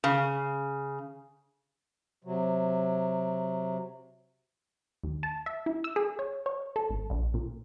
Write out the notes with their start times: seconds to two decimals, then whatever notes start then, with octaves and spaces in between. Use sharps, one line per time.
0.04 C#3
2.24 C3 F#3
5.03 D#2
5.23 A5
5.46 E5
5.66 E4
5.84 E6
5.96 G#4
6.19 C#5
6.46 C#5
6.76 A4
6.89 G#1
7.10 A#1
7.34 A#2